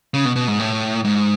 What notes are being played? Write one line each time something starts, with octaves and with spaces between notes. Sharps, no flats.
C#3
B2
B2
G#2
A2
G#2